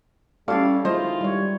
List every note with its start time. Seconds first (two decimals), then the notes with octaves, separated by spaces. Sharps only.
0.48 G3 C#4 E4 F#4 A4 D5 F5
0.85 D#3 F#3 G#3 E4 F4 C5 D#5
1.21 G3 C#5